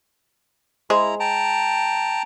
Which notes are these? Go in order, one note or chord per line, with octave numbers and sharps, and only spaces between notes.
G#3 E4 G#4 C5 A#5
G5 A5 A#5